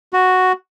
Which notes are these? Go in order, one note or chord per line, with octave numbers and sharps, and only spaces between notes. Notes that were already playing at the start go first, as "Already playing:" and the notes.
F#4